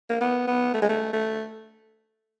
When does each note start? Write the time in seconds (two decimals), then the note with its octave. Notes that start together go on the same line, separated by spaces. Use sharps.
0.09 A#3
0.21 B3
0.47 B3
0.74 A3
0.82 G#3
0.89 A3
1.13 A3